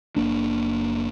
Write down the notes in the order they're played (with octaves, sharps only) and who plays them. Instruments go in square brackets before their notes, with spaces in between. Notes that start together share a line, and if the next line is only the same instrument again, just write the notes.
[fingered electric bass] F#1 A#3 D4